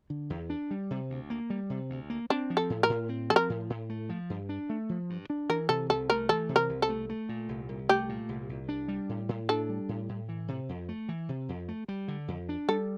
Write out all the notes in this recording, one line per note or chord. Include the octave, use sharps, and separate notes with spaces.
D3
E2
D4
G3
C3
D2
A#3
G3
C3
D2
A#3
C4 D4
F3
A4
A2
A#4
A2
C4
F3 A4
A#4
A2
A2
A3
F3
G2
D4
A3
F3
G2
D4
E3 A#4
C3 A4
C2 A4
A3 A#4
E3 A4
C3
A#4
C2
A4
A3
A3
A#2
C2
C2
A3 G4
A#2
C2
C2
D4
G3
A2
A2
D4 A4
G3
A2
A2
E3
C3
F2
A3
E3
C3
F2
A3
G3
D3
F2
D4
G3 A4